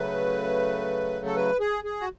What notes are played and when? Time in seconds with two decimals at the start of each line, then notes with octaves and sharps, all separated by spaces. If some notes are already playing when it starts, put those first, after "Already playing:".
Already playing: C#3 F#3 A3 B4
1.26 A4
1.36 B4
1.60 G#4
1.84 G#4
2.01 F#4